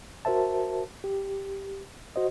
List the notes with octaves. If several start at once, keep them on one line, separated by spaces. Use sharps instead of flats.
F#4 A#4 C5 E5 A5
G4
F#4 C5 D#5